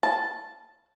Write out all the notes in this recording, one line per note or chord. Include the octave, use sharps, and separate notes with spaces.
A5